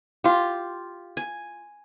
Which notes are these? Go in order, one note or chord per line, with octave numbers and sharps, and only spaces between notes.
F4 G4
G#5